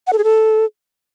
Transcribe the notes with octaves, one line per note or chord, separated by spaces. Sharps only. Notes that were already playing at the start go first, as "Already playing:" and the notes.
F#5
A4
G#4
A4